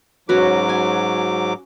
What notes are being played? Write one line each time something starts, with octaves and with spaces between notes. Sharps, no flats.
G#2 F#3 C#4 F#4 B4 D6
G#5